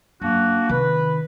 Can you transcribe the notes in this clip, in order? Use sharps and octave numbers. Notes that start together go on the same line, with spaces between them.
F#2 A#3 D4 F#4
C3 D#3 B4